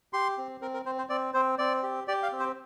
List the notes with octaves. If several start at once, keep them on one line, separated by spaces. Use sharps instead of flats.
G4 C6
C4
C4 A#4
A#4
C4 C5
C5
C4 D5
C4 C5
C4 D5
G4
G4 D5
F5
C4
C5